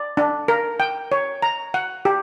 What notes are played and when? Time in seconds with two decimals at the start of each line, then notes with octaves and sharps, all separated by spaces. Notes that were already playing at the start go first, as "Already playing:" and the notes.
Already playing: D5
0.17 D4
0.48 A#4
0.80 G5
1.12 C#5
1.42 A#5
1.74 F#5
2.05 G4